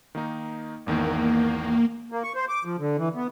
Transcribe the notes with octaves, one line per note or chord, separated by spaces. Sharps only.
D#3 A#3 D#4
G#1 E2 D#3 A#3
A#3
C#6
C5
D6
F3
D3
E3
B3